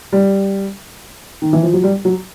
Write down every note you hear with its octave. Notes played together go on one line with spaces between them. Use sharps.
G3
D#3
E3
F3
F#3
G3
F#3